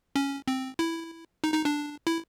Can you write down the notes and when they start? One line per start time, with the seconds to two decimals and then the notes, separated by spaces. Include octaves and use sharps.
0.16 C#4
0.48 C4
0.79 E4
1.44 D#4
1.54 D#4
1.65 D4
2.07 E4